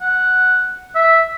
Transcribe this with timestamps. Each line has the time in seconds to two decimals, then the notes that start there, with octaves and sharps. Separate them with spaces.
0.02 F#5
0.95 E5